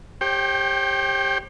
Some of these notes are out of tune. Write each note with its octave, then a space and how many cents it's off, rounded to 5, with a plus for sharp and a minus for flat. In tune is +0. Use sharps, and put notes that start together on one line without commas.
G4 +15 C5 +45 G5 -5